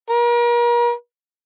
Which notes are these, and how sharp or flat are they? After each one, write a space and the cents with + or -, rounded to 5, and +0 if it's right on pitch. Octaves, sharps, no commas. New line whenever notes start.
A#4 +40